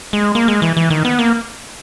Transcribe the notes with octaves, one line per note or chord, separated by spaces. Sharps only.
G#3
A#3
G#3
E3
E3
D#3
B3
A#3